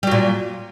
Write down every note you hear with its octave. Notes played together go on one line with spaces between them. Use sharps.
A#2 F#3 G3